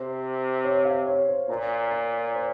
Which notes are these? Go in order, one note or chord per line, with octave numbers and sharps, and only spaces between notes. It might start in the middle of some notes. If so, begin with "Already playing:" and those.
Already playing: C3 C5
C#5
F5
C#5
C5
A#2 A#5
A#5
C5